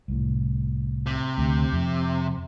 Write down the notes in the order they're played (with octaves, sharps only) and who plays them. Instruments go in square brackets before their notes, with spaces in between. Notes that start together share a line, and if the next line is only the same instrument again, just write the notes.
[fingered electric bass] C2 A2
[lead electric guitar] C3
[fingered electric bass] D2
F2